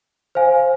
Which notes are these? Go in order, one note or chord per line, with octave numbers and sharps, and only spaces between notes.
C5 F5 G#5